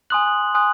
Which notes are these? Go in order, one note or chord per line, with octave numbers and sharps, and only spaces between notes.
G#5 C6 D#6 F#6 F#7
G#5 C6 D#6 F#6